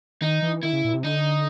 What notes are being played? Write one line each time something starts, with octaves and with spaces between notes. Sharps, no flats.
D#3 D#4
E3
D#3 E4
C#3
A#2
C3
D3 D#4